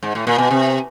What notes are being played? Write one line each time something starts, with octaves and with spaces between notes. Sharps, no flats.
G#2
A2
A#2
B2
C3